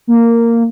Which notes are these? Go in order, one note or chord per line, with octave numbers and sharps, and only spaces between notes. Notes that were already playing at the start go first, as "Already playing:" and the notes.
A#3